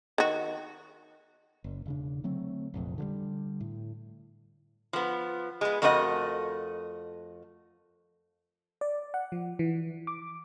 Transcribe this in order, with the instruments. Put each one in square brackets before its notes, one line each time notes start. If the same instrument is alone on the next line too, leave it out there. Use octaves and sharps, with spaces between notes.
[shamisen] D#3 F#4
[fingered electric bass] F#1
E1 C#3 D4
D3 F#3 A3 C4
F1 A#1 F2
D3 F3 G3
A2
[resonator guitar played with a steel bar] F3 B3
G#3 B3
F2 A3 F#4 A#4 D#5 F#5
[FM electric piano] D5
F#5
F3
E3
D6